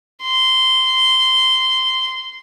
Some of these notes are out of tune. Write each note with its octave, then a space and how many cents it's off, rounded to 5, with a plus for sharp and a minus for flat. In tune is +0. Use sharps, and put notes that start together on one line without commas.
C6 -10